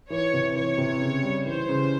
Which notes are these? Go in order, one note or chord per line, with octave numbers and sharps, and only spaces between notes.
E3 C#5
C3
E3 C#5
C3
C#3
G3
E3 C5
C#3